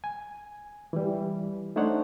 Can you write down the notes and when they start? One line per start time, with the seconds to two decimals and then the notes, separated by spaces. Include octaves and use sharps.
0.04 G#5
0.93 E3 G3
1.76 A3 D4 D#4 C5 C#5 F#5